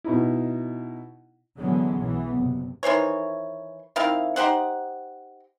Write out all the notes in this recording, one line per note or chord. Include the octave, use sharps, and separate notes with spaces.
B2 D#4 E4
D3 E3 F#3 G#3 B3 C#4
B1 E3 B3
F#1 C3
D#3 E3 C5 C#5
D#3 C4 E4 F5
D#4 G4 C5 F#5